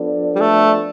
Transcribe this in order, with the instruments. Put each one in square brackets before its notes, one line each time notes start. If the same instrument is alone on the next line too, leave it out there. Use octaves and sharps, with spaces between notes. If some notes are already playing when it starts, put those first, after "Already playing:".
Already playing: [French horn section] F3 B3 D4 A4 D5
[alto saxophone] G3
A3